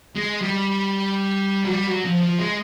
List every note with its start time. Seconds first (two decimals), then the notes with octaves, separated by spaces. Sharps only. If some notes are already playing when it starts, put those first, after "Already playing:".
0.16 G#3
0.42 G3
1.64 F#3
1.70 G3
1.87 F#3
2.05 F3
2.22 F3
2.39 G#3